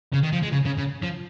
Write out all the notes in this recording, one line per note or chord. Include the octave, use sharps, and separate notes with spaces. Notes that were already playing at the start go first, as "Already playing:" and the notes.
C#3
D#3
F3
G#3
C#3
C#3
C#3
F3